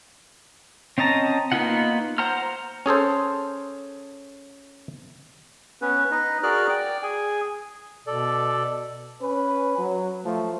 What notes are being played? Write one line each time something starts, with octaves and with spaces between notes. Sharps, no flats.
C4 C#4 D#5 A5 A#5
A#3 B3 D#4 F4 F#5
C5 F#5 A#5 C6 F6
C#4 G#4 A4 C5
B3 C#4 B4
D#4 B4 D#5
F#4 G#4 A#4 D5 F6 F#6
D5 G5
G#4 G#5
B2 A4 D5
C#4 B4
F#3
F3 A3